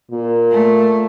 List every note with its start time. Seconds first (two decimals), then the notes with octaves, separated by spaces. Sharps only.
0.12 A#2
0.51 A3